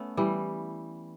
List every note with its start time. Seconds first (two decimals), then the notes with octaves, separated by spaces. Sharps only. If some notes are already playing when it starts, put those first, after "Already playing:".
Already playing: A3 B3 C#4
0.17 E3 G3